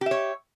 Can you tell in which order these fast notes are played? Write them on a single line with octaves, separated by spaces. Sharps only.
G4 E5 C#5